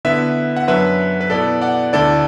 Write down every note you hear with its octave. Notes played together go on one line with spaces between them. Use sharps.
D3 B3 E4 B4 E5
F#5
F#2 F#3 D4 B4 E5
B4
B2 B3 E4 A4 D5
D5 F#5
D2 D3 A3 E4 A4 D5